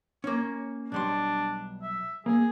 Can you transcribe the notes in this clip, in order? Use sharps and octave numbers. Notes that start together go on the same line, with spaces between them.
A#3 C#4
B1 G3 D4 C6
E5
A#3 G#4